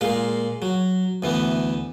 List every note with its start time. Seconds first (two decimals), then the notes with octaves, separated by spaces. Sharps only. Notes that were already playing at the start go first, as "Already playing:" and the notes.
0.01 A#2 G#3 F5
0.62 F#3
1.23 D2 E3 B3